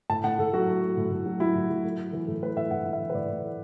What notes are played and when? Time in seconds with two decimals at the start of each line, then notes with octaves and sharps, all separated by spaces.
0.10 A2 A5
0.24 A2 F#5
0.39 A2 A4
0.53 F#3 F#4
0.68 A3
0.82 A3
0.97 A2
1.11 A2
1.26 F#3
1.40 F#3 E4
1.55 A2
1.70 F#3
1.84 A3
1.99 A3
2.13 E3
2.28 A2 A4
2.42 A3 B4
2.56 A2 E5
2.71 A2 F#5
2.85 A2
2.93 E5
3.00 E3
3.10 B4
3.14 A2 D5
3.29 A2
3.44 A3